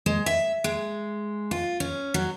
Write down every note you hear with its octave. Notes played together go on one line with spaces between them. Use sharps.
G#3
E5
G#3
F4
C#4
F#3